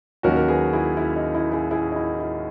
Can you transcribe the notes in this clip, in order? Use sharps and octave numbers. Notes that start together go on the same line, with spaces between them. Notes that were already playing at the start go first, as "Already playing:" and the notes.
D#2 D#3 F#3 A#3 C#4 F#4 A#4
A#4
G#4 B4
E4 G#4
E4
D#4
E4
E4 G#4
E4 G#4
D#4
E4
E4